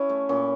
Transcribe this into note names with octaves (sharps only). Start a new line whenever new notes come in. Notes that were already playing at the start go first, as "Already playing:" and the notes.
Already playing: C#4 E4
A3
A#2 C#4